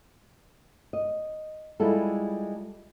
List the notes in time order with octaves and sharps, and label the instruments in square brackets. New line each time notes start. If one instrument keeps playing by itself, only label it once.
[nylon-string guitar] D#5
G3 G#3 E4 F4 A4